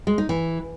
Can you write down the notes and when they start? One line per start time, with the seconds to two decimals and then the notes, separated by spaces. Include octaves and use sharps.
0.07 G#3
0.18 D#4
0.29 E3